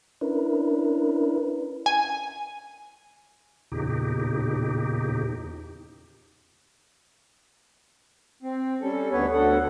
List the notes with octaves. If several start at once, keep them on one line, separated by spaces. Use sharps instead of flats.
C#4 D4 E4 A#4 B4
G#5
E2 A#2 C#3 D#4 G4
C4
G3 C#4 A4
D2 D3 B3 B4 C#5
D2 D3 A4 F#5